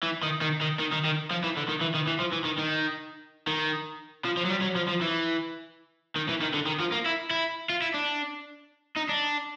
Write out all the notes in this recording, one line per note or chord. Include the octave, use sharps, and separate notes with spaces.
E3
D#3
D#3
D#3
D#3
D#3
D#3
F3
E3
D3
D#3
E3
D#3
E3
F3
E3
D#3
D#3
D#3
F3
F3
F#3
G3
F#3
F3
F3
E3
D#3
E3
D#3
D3
D#3
F3
A#3
E4
E4
F4
E4
D4
D#4
D4